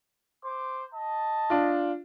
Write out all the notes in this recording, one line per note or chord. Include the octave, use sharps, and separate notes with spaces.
C5 D6
D#5 A5
D4 F4